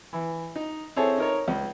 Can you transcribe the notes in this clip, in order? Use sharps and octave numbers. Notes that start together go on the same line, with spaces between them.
E3
D#4
C4 E4 G#4 A4 C#5
D#4 A#4 C#5
C#2